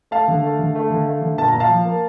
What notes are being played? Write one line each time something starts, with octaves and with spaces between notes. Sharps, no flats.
A3 F5 A5
D3
A3
D3
A3
D3
A3
D3
A#2 A5
A#2 A#5
F5 A5
F3
A#3